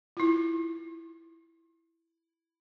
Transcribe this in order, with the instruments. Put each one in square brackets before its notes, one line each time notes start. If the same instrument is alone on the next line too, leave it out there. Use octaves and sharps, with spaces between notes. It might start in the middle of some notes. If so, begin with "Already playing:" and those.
[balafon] E4 F4